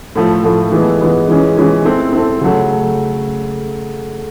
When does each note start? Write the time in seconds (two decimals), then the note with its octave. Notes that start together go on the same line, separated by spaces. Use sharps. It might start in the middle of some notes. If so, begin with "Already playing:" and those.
0.16 A2 F3 A3
0.44 A2 F3 A3
0.72 E3 G#3 B3
1.01 E3 G#3 B3
1.29 E3 G#3 C#4
1.57 E3 G#3 C#4
1.85 C4 E4 A4
2.13 C4 E4 A4
2.41 C#3 F#3 A3